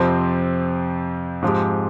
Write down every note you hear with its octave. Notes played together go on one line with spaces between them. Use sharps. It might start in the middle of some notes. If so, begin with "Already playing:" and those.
Already playing: F2 C3 F3 C4
G#2 F3 G#3 C4 G4